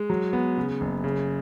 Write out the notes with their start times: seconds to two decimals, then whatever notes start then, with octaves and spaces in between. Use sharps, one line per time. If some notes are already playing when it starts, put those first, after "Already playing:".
Already playing: G#3
0.10 F#3
0.33 B3
0.57 C#3
0.81 F#1
1.04 C#3